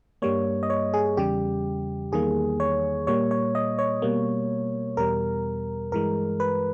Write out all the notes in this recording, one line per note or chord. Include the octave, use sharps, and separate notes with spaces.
G2 G3 A#3 C#5
D#5
C#5
G#4
E2 C#3 G3 G4
E2 D#3 G3 A#3 G#4
C#5
A#2 G3 A#3 C#5
C#5
D#5
C#5
B2 G3 A#3
E2 B2 G3 A#4
G2 E3 G#3 A#4
B4